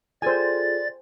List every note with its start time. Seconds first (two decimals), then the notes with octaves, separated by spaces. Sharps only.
0.22 F4 G#4 A4 C5 D5 G#5 A6